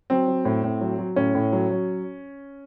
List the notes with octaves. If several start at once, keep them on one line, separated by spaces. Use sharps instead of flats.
F#3 C4
F#3
A2
A2
F#3
F#3
A2 C#4
A2
F#3
F#3